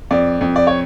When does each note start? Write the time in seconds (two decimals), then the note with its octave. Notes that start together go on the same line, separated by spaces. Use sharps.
0.11 F2 D5
0.41 F2
0.56 D5
0.67 C#5